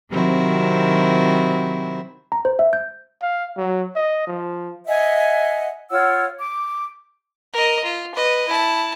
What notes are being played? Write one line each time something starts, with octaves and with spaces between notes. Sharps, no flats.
C3 D#3 F#3 C4 E4 F#4
A#5
C5
E5
G6
F5
F#3
D#5
F3
D#5 E5 F#5 G#5
F4 C#5 F#5 E6
D6
A#4 D#5
F4
B4 D#5
E4 A5